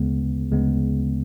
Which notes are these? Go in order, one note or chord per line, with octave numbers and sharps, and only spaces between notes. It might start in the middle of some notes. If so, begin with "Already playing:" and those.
Already playing: D2 C#3 G#3 B3
D2 C#3 G#3 B3